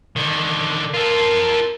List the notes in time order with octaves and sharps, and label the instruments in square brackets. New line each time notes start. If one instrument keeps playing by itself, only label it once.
[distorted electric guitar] D3 D#3
[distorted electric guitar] F4 A4 [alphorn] A#4